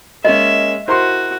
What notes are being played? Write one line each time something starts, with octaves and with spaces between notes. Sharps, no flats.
G#3 A#3 C#4 D#5 E5
E4 F#4 A#4 C5 C6